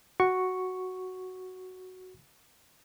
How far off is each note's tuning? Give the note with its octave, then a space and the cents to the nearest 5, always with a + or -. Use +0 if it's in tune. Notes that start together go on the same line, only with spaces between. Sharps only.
F#4 +0 C#6 +0